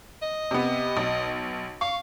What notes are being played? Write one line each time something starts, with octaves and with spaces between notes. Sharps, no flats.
D#5
C3 B3
B1
F5 C#6